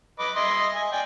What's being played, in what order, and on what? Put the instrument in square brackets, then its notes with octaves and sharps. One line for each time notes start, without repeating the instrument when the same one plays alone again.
[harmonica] B4 D#5 D6
D#5 E5 C6
D#5 G#5
D5 G5 G#5